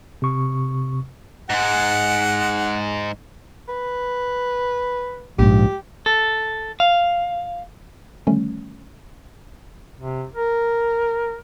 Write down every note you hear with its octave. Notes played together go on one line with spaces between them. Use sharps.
C3 C#6
G#2 G#3 F#5
B4
A#1 G#2 G4
A4
F5
D3 D#3 F3 G3 A3 C#4
C3
A#4